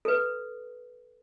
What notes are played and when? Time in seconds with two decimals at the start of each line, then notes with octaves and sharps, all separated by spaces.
0.05 A4 B4